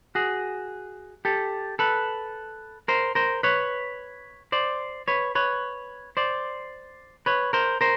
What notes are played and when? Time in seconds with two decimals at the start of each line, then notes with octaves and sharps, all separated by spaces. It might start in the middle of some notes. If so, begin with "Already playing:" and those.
0.15 F#4 G#4
1.25 G4 A4
1.79 A4 B4
2.88 A#4 C5
3.15 A#4 C5
3.43 B4 C#5
4.52 C5 D5
5.08 B4 C#5
5.35 B4 C#5
6.17 C5 D5
7.26 B4 C#5
7.53 A#4 C5
7.81 A#4 C5